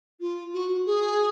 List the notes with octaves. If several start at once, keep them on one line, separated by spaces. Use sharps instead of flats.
F4
F#4
G#4